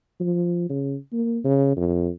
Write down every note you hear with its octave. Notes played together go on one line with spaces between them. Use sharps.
F3
C#3
A#3
C#3
F2